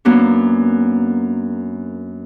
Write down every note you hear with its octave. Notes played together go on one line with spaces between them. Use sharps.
F#2 A#3 B3 D4